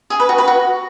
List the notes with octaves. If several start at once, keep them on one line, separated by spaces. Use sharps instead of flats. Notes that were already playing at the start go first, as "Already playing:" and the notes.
G#4
B4
F#4
B4
F#4